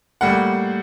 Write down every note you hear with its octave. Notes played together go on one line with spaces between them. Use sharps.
A2 G3 A#3 F#5